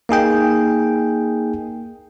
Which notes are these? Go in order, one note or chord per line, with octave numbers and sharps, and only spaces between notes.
A#3 D#4 G#4 G5